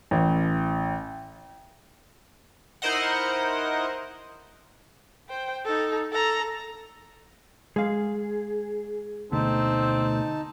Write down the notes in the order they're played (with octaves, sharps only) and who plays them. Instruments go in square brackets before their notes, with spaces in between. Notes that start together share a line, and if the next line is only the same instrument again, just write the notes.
[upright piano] A1
[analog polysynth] D#4 E4 A#4 C5 D#5 F#5
[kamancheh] C5 G5
D#4 A4
A4 A#5
[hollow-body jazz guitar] G#3 F5 [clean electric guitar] G#4
[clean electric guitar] D2 B2 A3 [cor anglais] C4 [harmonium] D#4 A5